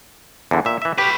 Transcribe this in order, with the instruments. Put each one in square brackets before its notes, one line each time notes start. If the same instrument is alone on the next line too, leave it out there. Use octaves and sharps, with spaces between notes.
[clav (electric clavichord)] E2 D3
A#2 E5
E3 E5
[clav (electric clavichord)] G4 [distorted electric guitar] B4 C#5